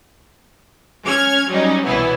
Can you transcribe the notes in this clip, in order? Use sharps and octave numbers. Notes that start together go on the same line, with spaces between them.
C#4 F6 G#6
F#3 G3 C#4 D#4
C2 B2 E3 B3 E4 C#5